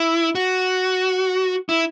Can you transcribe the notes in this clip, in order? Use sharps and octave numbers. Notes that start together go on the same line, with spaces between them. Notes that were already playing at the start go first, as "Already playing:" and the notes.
Already playing: E4
F#4
E4